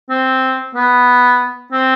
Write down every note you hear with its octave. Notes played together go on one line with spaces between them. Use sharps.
C4
B3
C4